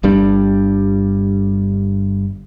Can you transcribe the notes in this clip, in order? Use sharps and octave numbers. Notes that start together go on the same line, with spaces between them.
G1 G2 G3 D4